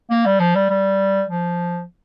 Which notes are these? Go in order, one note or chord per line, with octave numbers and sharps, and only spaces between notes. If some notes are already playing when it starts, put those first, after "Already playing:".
A#3
G3
F3
G3
G3
F3